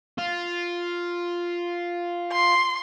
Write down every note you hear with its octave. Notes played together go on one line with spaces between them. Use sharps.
F4
C6